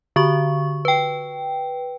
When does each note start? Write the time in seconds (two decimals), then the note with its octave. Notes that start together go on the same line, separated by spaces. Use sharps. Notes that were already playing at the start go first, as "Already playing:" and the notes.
0.16 D3 F#4 C#6
0.85 B4 G5